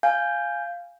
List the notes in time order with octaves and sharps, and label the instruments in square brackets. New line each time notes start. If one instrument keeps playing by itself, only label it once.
[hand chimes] F5 G#5 G6